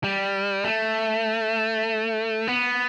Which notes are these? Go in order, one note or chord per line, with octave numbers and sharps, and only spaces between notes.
G3
A3
B3